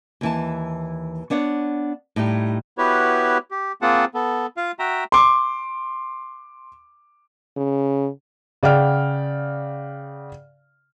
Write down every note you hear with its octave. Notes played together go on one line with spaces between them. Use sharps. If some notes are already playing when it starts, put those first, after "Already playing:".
D#2 E3 A5
B3 D4 C#5 F#5
A2 G3 D#4 G4
B3 E4 F#4 G4 B4 C#5
G4
A#3 C4 F4 G#4 F#5 A5
B3 A4
F4 F5
F#4 E5 G5 A#5
C6 D6
C#3
C#3 D5 F#5 G5 F6